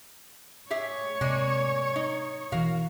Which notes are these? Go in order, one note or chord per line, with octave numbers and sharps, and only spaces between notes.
G4 G#4 C#5 E5
C3 G#3 A#3 D5
D#4
B2 E3 F#4 A#4 F5